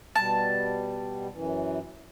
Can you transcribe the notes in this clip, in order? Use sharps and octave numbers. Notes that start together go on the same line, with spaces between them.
B2 G3 A5
F#2 E3